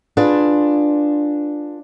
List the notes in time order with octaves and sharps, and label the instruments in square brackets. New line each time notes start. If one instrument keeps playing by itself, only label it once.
[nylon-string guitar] D4 F4 G#4 B4